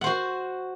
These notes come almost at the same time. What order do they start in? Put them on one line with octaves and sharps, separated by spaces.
F#5 C5 F#4